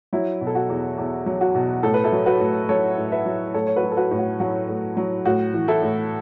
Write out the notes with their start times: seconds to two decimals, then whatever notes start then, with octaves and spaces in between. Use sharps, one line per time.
0.13 F#3 E4
0.41 B2
0.47 A4
0.55 F#4
0.69 E2
0.98 E2
1.26 F#3
1.41 F#4
1.55 B2
1.83 A2 A4
1.94 B4
2.04 E4 A4
2.12 F#3
2.26 F#4 B4
2.40 A2
2.69 F#3 A4 C#5
2.98 A2
3.12 B4 E5
3.26 F#3
3.54 A2 A4 C#5
3.67 C#5
3.76 F#4 B4
3.83 F#3
3.92 A4
3.97 F#4 B4
4.11 A2
4.18 F#4
4.40 F#3 F#4
4.69 A2
4.97 F#3
5.25 A2 F#4
5.54 E3
5.68 E4 A4
5.82 A2